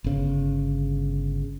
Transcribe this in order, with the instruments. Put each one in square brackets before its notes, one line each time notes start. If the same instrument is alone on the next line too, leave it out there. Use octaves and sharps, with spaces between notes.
[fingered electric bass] G1 C#3